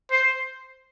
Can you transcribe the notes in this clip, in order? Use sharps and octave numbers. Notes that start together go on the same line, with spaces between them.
C5 C7